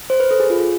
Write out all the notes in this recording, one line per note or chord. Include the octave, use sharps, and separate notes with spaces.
C5
B4
A4
G#4
F4